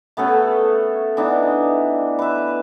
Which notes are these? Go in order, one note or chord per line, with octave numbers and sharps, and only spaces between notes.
A3 B3 C#4 A4
E3 B3 D4 D#4
B4 E5